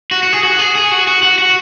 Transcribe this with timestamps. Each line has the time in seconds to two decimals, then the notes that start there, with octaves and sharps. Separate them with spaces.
0.11 F#4
0.23 F#4
0.33 G#4
0.43 F#4
0.59 G#4
0.75 G#4
0.91 F#4
1.07 F#4
1.23 F#4
1.38 F#4